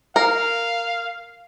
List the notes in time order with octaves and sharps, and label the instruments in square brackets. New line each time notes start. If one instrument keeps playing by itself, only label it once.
[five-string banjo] A#4 [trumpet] F5